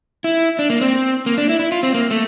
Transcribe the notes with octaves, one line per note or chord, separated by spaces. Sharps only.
E4
D4
A#3
C4
A#3
D4
E4
E4
F4
C4
A#3
A3